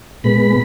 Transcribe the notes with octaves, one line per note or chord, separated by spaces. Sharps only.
A#2 G#3 B3 B5